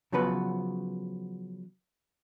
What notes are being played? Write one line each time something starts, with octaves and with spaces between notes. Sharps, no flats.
C#3 F3 F#3 B3 B4